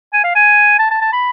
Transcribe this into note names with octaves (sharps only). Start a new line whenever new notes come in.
G#5
F5
G#5
A5
A5
A5
B5